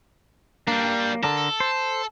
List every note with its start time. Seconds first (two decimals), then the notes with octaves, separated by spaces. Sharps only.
0.68 G3 A#3 D4
1.23 D3 D4 A4 A#4
1.60 C5